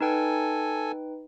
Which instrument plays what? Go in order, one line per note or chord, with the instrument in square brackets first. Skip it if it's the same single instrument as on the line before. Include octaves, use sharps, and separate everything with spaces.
[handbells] D#4 B4 G5 [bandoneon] A4 G#5